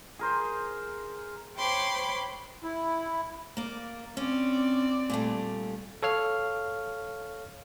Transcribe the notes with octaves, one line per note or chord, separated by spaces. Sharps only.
G#4 A#4 C5
C5 C#5 G5 B5 C6 D6
E4
A#3 D5
C4 C#4 D5
A#2 G3 A3
A4 C#5 F5 F6